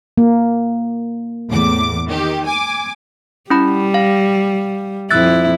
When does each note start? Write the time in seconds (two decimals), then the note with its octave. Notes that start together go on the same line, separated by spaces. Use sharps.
0.18 A#3
1.50 E2 A2 D6
2.08 D#3 G4
2.45 G#5 D6
3.50 G3 C#4 E4 B5
3.94 F5
5.11 F2 E4 E6 F#6 A6